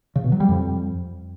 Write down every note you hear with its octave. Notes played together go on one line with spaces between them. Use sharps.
C#3
B2
F#3
G3
F2